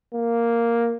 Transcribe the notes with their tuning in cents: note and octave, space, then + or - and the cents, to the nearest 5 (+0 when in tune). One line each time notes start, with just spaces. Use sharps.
A#3 +0